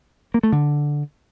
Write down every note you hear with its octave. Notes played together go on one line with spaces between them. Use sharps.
A#3
A3
D3